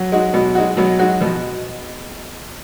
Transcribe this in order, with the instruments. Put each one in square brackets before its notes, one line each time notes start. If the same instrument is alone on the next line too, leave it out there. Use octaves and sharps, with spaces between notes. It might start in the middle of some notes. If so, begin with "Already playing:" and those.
Already playing: [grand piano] F#3
[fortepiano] G#3 D#4 F#4
B2
G#3 D#4 F#4
[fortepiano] B2 [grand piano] F#3
[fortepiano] G#3 D#4 F#4
[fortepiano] B2 [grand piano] F3